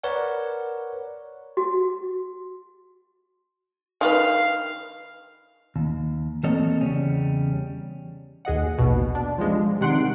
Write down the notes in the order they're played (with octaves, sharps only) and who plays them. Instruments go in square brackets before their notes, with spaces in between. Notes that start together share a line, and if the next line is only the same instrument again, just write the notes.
[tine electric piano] A#4 B4 C#5 D5 F#5
[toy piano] F#4
[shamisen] D#3 F4 B4 [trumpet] F5
[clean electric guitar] D#2
E3 A#3 C4 A4 C#5 D#5
E2 C#3 G3 C#4
[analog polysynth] D#2 G#4 D#5 F#5
A#1 D#2 B2 B3
D4
F3 G3 G#3 D4
C3 D#3 F#5 C6 F#6 D7